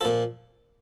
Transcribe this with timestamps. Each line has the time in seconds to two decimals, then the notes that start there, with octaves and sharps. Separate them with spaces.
0.01 A#2 F3 A4